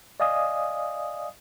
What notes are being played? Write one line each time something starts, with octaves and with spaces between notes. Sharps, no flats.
D5 D#5 F5 G#5 D#6